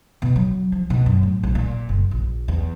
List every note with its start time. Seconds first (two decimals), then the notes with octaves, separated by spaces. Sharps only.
0.22 B2
0.36 F#3
0.72 F3
0.90 B2
1.06 F#2
1.23 A2
1.43 B1
1.55 A#2
1.89 F#1
2.11 A#1
2.48 E2